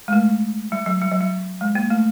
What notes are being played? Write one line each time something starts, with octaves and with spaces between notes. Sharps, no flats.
G#3
A3
G3
F#3
G3
F#3
G3
G#3
A#3
A3